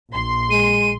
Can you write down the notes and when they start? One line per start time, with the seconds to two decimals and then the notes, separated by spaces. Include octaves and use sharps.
0.12 A#1 C6
0.50 G#3 D#7